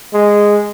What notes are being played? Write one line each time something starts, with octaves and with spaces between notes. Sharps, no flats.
G#3